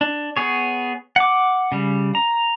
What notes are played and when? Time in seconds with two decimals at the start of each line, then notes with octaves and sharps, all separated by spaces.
0.01 D4
0.37 B3 G#4 C#5
1.16 F#5 D6
1.72 C#3 G3
2.15 A#5